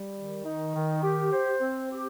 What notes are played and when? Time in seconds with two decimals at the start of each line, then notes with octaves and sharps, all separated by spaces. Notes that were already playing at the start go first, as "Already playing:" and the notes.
Already playing: G3
0.15 D#3
0.44 D#4
0.74 D#3
1.02 G4
1.31 C5
1.60 C4
1.90 G4